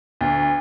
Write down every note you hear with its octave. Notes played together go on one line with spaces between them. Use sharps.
D2